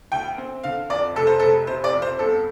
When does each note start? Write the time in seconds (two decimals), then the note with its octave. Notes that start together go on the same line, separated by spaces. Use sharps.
0.12 D2 G5
0.38 C4
0.63 D3 F5
0.90 F2 D5
1.16 F1 A4
1.27 C5
1.39 F1 A4
1.67 C3 C5
1.84 D5
1.93 F2
2.02 C5
2.19 G1 A4